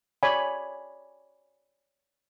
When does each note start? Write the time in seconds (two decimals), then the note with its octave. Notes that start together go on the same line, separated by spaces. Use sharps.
0.23 C#5 D5 G#5 B5